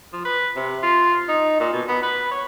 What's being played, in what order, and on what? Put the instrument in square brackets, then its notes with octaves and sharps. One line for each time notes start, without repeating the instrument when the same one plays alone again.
[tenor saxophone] F3
B4
C3
F4
D#4
A#2
B2
B3
B4
C#5